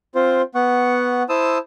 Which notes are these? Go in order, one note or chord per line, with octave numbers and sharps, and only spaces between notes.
C4 F4 C5
B3 F#5 C#6
E4 C5 A5 D#6 E6